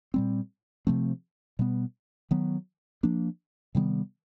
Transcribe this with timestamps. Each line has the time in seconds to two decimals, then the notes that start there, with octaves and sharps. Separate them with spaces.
0.14 A#2 G3 C4
0.87 C3 F3 A3 C4
1.59 B2 G3 B3
2.31 D#3 F#3 B3
3.03 F3 A#3 D4
3.75 C3 D#3 G3 B3